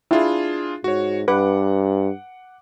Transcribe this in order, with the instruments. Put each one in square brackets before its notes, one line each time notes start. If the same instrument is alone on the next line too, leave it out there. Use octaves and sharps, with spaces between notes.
[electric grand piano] D4 F4 G#4 [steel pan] E4
[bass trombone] G#2 [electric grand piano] F#4 C#5
[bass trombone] G2 [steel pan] B4 [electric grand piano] F#5 D6